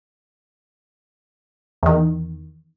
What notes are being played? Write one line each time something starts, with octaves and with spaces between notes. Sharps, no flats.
E2 D#3